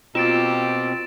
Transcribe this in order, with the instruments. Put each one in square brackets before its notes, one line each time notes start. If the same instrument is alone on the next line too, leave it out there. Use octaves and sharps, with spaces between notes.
[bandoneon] B2 C4 [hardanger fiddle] A#3 G4 [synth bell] F4 [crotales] A6 D7 E7